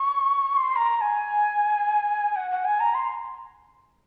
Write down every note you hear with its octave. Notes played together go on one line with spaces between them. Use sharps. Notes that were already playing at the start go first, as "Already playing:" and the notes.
Already playing: C#6
C6
A#5
A#5
G#5
F#5
F#5
G#5
A#5
C6